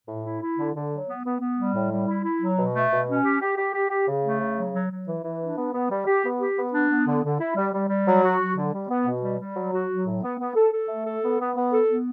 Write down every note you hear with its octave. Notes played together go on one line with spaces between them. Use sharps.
A2
E4
E4
D3
D3
F#3
B3
B3
B3
G3
A2
G3
E4
E4
F#3
B2
A3
B2
C#4
G4
G4
G4
G4
G4
C#3
A3
C#3
F#3
F#3
F#3
E3
E3
D4
B3
B3
G3
G4
B3
G4
B3
D4
B3
D3
D3
E4
G3
G3
G3
F#3
F#4
F#3
D3
G3
B3
B2
G3
G3
F#3
F#4
F#3
A2
B3
B3
A4
A4
A3
A4
B3
B3
B3
A4
B3